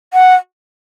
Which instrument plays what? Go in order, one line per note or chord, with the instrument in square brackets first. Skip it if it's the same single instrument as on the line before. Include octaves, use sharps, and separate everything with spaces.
[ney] F#5